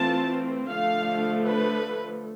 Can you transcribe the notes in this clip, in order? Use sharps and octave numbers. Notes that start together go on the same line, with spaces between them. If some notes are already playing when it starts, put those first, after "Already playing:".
Already playing: E3 A3 C4 F4 A5
D3 F3 A3 F5
B4